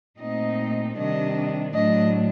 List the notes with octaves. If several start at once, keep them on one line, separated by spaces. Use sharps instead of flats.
A#2 A3 C4 D#4 D#5
C3 D#3 G3 D4 D#5
A2 F#3 A3 D4 D#5